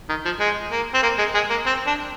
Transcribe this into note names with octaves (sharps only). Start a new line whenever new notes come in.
D#3
F3
G#3
A#3
C4
A#3
G#3
G#3
A#3
C4
D4